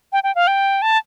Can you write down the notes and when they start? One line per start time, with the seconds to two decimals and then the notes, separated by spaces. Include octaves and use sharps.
0.13 G5
0.24 G5
0.35 F5
0.47 G5
0.82 A5